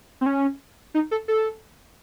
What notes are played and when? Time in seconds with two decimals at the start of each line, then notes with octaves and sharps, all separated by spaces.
0.21 C4
0.26 C#4
0.94 D#4
1.11 A4
1.28 A4